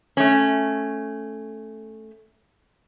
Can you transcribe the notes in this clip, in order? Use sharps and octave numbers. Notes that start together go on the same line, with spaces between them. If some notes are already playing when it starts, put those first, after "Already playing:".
A3 C#4